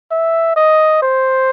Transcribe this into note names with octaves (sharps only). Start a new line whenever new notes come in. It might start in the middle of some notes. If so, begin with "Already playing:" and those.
E5
D#5
C5